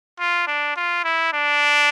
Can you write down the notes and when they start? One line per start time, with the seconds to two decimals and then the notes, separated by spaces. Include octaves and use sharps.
0.20 F4
0.47 D4
0.76 F4
1.04 E4
1.33 D4